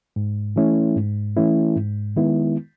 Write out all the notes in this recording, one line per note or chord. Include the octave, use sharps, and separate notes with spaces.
G#2
E3 A3 C#4 E4
G#2
E3 A3 C#4 E4
G#2
D#3 G#3 B3 E4